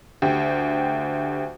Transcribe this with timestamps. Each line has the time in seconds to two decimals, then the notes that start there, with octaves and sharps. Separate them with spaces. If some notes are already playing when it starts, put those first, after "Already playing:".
0.22 D2 G4